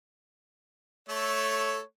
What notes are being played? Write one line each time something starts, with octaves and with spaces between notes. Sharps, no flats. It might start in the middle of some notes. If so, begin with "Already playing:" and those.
A3 A4 C#5